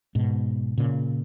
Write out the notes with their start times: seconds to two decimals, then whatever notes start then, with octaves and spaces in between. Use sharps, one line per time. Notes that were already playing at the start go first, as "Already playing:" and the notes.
0.15 G#2 B2
0.78 A#2 C#3